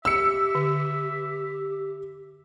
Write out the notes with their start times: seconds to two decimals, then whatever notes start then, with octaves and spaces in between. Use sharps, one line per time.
0.05 G4 E5 E6 C#7
0.55 D3